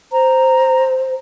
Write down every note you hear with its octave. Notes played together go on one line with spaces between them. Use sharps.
C5 A#5